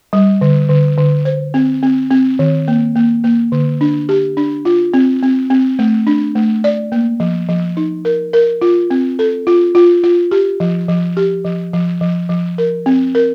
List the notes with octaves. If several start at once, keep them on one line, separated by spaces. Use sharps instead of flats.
G3
D3
D3
D3
C5
C4
C4
C4
D#3
A#3
A#3
A#3
D3
D4
G4
D4
F4
C4
C4
C4
A3
D4
A3
D5
A#3
F3
F3
D#4
A#4
A#4
F4
C4
A4
F4
F4
F4
G4
F3
F3
G4
F3
F3
F3
F3
A#4
C4
A#4